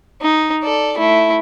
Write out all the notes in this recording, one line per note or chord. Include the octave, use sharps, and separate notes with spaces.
D#4
A4 D5
A3 E4